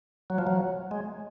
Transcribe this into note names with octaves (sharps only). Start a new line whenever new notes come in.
F#3
F3
F#3
G#3